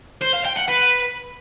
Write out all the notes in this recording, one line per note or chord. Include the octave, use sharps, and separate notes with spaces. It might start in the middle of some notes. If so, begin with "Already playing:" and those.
C5
F5
G5
F#5
B4